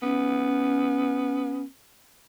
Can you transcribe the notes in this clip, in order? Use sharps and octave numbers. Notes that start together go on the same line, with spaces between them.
B3 C#4